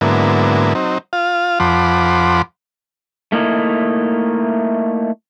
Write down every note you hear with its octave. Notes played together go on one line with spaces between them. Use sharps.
G#2 D3 F#3 A#3 B3 E4
F#3 C4 D#4
F4 F5
F2 F3 F#5 B5 C6 D6
A3 A#3 D#4 E4